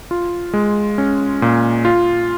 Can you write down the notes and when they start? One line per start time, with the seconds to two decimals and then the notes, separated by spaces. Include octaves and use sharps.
0.11 F4
0.54 G#3
0.98 C#4
1.42 A#2
1.85 F4